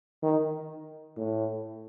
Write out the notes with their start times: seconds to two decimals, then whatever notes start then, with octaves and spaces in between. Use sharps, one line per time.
0.22 D#3
1.17 A2